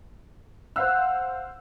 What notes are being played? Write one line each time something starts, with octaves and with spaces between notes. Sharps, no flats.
C5 F5 F#5 E6